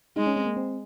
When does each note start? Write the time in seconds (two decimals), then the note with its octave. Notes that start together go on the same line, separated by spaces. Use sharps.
0.16 G#3 D#4
0.27 C#4
0.36 C4
0.46 A#3
0.57 C4